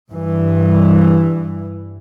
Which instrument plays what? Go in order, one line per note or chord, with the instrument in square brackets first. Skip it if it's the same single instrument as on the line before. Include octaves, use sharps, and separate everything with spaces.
[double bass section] G2 E3